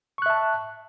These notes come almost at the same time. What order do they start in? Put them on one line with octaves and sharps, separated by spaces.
C#6 F#6 E5 A5